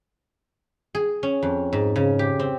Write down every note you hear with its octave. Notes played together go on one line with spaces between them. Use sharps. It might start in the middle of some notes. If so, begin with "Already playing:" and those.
G#4
C#4
F2
G#2
C#3
G4
C4